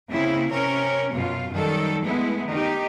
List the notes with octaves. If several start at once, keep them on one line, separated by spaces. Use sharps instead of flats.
C#3 A#3 C4 E4
C3 C#4 A#4 C#5
F#2 B2 F4
F#2 D#3 F#3 G3 A4
G#3 A3 B3 E4
D#3 D#4 G4